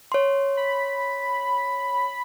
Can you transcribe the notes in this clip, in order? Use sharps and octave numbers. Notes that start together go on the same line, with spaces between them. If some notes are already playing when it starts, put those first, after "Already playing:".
C#5 C6
B5